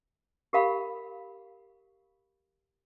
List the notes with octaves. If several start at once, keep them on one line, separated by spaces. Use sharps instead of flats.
G4 A#4 F5 B5